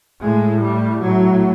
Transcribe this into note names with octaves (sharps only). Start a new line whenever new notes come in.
A2 G#3
G3
A2 F#3